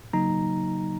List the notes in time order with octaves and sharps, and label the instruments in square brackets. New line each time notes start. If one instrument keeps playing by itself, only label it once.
[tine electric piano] C#3 F#3 A#3 D#4 A#5